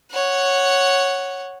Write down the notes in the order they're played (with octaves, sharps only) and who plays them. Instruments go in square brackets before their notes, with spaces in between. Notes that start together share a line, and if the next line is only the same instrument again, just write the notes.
[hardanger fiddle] C#5 F#5